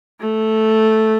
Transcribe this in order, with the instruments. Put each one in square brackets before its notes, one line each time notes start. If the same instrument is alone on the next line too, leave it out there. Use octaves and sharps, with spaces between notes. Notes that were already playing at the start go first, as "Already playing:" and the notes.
[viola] A3